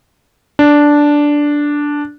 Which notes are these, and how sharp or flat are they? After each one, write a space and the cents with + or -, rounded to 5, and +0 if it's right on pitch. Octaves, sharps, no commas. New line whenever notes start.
D4 -5